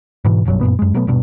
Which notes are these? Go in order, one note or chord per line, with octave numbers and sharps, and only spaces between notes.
G#2 B2 E3
F#1 B1 G2 F#3
F#2 A#2 B3
F#2 G#3
B2 F#3 A3 B3
D#1 G2 B2